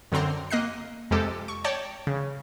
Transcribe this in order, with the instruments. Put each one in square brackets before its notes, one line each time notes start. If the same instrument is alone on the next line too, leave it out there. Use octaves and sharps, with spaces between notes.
[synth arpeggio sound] F#2 D3 C4 A#5 C6
A#3 D#5 F#6 C7
F2 C3 G#3 G4 A4
C#6
C#5 D5 G5 A5
C#3